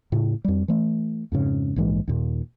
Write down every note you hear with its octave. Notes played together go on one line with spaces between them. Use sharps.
A2 C#3
F2 G3
E3 A3
F2 G#2 C#3
A#1 G#2 E3 G#3
D#2 A#2